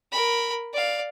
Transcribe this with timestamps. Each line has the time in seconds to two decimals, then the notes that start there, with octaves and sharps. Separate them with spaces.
0.12 A#4 B5
0.73 D5 F5